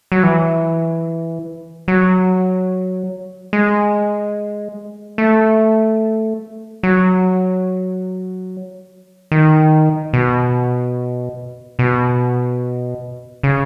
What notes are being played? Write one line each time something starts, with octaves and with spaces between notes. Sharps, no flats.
F#3
E3
F#3
G#3
A3
F#3
D#3
B2
B2
C#3